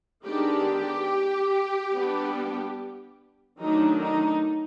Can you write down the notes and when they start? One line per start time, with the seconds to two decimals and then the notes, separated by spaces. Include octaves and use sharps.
0.24 D#3 G#3 B3 D4 G4
1.92 G3 B3 D4
3.59 D#3 F#3 A3 D4 D#4
4.01 D#4